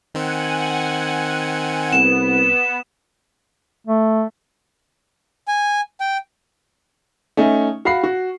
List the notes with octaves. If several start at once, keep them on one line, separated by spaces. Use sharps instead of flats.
D#3 C4 F#5 G#5
C2 B3 E7
A3
G#5
G5
A3 C#4 D#4
F#4 F5 B5 C7
F#4